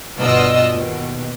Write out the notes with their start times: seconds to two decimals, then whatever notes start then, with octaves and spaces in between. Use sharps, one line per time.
0.18 G1 B2 F4 D5 D#5 E6
0.72 D#2 B2